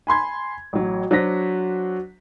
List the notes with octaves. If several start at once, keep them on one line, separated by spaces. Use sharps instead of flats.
G#5 B5 C6 G#6
A1 F#3
F#3 D4 F#4 C5 A#6 B6